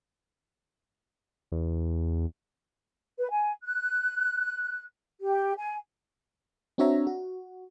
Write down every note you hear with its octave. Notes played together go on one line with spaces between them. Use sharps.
E2
B4
G#5
F#6
G4
G#5
C4 D4 F#4 C#5 E5 A#5
F#4